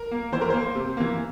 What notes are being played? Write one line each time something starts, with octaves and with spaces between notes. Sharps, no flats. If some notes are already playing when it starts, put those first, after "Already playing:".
Already playing: A#4
A#3
E3 C5
A#4
A#3 C5
C3
E3 A#3